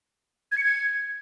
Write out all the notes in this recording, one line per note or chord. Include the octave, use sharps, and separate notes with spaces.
G#6
C#7
G#6